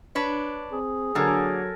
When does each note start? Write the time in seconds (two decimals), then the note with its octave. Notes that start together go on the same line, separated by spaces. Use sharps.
0.15 D4 B4 C#5
0.72 C4 G#4
1.15 D3 F#3 A#3 A4 A#4 G#5